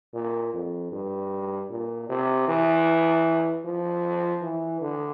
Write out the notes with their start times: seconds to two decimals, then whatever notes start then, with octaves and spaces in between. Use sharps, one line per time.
0.14 A#2
0.53 F2
0.92 G2
1.70 A#2
2.09 C3
2.48 E3
3.65 F3
4.42 E3
4.81 D3